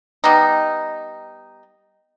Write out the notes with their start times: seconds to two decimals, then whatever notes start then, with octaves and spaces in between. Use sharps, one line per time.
0.24 G3 B3 D#4